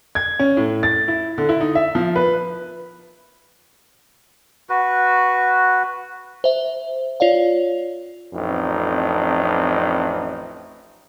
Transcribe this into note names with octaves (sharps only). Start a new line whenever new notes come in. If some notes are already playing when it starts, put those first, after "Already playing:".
G#6
C#4
A2
A6
E4
D3
E4
D#4
E5
F3
B4
F#4 B4
C5 E5
F4 C#5 D5 F5
A1 F2 C4 D4 D#4